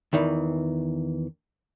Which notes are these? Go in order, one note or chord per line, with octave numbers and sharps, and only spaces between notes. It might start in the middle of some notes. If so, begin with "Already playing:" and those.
E2 D#3 E3